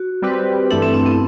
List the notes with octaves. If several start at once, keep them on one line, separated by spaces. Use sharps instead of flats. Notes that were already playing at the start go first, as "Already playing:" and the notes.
Already playing: F#4
G3 C4 G4 B4
G2 E3 A3 D4 E4 A4
C4
C4
B3